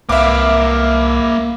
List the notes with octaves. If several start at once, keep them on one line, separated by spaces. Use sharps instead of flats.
C2 A#3 B4 E5 F5 D6